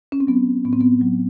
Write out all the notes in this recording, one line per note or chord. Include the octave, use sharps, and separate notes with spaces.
C#4
C4
F#3 B3
A2 B3
C4
B3
F#3